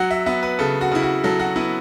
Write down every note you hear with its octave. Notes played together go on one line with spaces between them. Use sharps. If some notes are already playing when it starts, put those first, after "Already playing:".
Already playing: F#3 F#5
E5
B3 E5
B4
C#3 A4
F#4
C#3 E4
F#4
F#3 A4
F#4
B3 E4